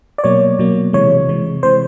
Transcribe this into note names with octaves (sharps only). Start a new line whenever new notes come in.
D5
B2 F#3 A#3 C#5
B2 F#3 A#3
C3 E3 G#3 C#5
C3 E3 G#3
C3 E3 G#3 C5